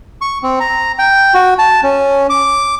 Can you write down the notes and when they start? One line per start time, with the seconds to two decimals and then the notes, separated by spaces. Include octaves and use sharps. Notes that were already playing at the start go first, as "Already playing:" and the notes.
0.21 C#6
0.43 C4
0.60 A#5
0.99 G5
1.34 F#4
1.58 A5
1.83 C#4
2.30 D6